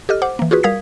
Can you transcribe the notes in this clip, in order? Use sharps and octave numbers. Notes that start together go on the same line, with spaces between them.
G4 A4 D#5 F6
C5 F#5 D6
E3 A#3
F4 F#4 G#4 B4
G3 A#4 F5 D#6 G#6 B6